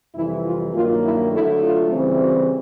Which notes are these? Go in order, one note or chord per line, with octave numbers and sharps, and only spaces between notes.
F2 C3 E3 G3 E4
F4
G2 D#3 F#3 A#3 F4
E4
D3 F#3 A3 E4
F4
C#3 E3 G3 C4
F#4